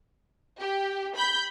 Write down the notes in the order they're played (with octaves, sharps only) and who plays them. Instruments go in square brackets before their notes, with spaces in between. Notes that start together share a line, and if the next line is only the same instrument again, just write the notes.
[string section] G4
B5 G6